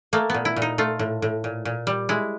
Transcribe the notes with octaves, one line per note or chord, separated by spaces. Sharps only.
A3 A#3
A#2 B3
E4
A#2
D#4
A3 F4
A2
A2
A#2
A#2
G3
G#3 E4